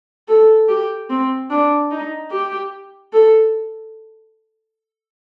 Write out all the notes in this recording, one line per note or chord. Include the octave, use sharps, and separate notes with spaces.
A4
G4
C4
D4
D#4
G4
A4